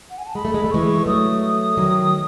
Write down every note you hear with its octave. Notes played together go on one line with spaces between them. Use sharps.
F#5
G#5
A5
G#3 B5
A3
G#3
A3
E3 G#3 C#6
F#3 A3 D#6
D#3 F#3